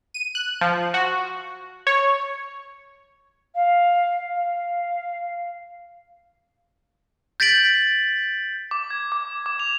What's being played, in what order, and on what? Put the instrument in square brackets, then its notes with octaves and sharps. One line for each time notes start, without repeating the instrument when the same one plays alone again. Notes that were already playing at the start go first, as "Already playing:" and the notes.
[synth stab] D#7
F#6
F3
F#4
C#5
[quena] F5
F5
[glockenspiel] G6 A6 B6 D7 F#7
[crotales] D6
G#6
D6
D6
F7